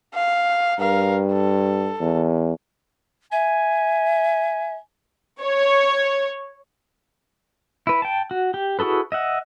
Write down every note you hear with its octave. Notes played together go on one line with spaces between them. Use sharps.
F5
G2 A#4 F5
A4
E2
E5 G#5
C#5
E4 B4
G5 A5
F#4
G4
E4 F#4 G#4 A4 B4
D#5 E5 F#5